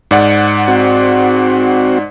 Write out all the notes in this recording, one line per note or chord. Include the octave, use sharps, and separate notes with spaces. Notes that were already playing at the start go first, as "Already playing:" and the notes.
G#2 D5 F#5
C4 F#4